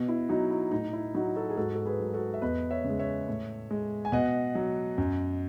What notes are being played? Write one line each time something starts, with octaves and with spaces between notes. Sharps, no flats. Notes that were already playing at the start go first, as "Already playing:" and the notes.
Already playing: B2
E4
F#3 D#4 F#4
E4
A2 D#4
E4
F#3 D#4 F#4
F#4 A4
G#4
G#2 F#4 A4
A4
G#4 B4
F#3
F#4 A4
E5
E2 B4 D#5
C#5 E5
C#3
G#3
C#5 E5
A2
G#3
G#5
B2 D#5 F#5
F#3
F#2